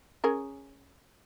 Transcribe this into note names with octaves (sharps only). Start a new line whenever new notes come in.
C#4 G#4 A#4